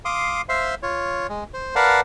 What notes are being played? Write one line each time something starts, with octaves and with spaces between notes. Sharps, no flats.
F5 C6 D6 D#6
C5 E5 F5 C6
F4 C#5
G#3
C5
A#4 B4 D5 F5 F#5 A5